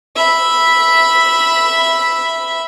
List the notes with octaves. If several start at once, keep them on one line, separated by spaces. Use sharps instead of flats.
E5 B5